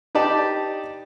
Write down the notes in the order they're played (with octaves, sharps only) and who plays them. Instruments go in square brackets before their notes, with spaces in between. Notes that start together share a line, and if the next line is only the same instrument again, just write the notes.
[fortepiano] D#4 G4 B4 D5 A5